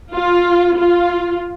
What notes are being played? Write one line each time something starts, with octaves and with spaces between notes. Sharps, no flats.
F4
F4